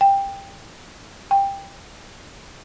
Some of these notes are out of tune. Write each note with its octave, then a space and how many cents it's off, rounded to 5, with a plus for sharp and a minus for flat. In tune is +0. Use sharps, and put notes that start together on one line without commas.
G5 +10
G5 +15